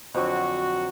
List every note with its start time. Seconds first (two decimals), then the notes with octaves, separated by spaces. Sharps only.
0.15 F2 D3 F#3 F#4